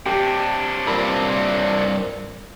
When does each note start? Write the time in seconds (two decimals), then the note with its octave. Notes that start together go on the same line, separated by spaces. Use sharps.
0.06 C3 D4 G4
0.87 G2 A#2 C4 B5